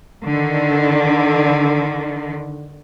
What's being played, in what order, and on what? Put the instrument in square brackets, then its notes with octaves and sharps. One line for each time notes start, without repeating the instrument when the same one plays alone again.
[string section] D3 D#3